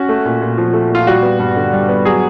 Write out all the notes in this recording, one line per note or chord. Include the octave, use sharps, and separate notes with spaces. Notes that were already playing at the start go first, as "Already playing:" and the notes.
Already playing: C#4 F#4
A3
A#2
A#2
F3
A3
A#2 F4
G3 F#4
B3
G2
D3
G3
B3
F#3 G#4